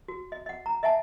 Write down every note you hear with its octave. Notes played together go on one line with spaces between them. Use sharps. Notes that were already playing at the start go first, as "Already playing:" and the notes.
F#4
D#5
D#5 F#5
A#5
D#5 E5 F#5 G#5 A5